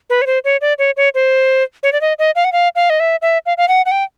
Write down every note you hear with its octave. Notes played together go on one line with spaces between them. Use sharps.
B4
C#5
C5
C#5
D5
C#5
C#5
C5
C#5
D5
D#5
D#5
F5
F#5
F5
F5
D#5
E5
E5
F5
F5
F#5
F#5
G5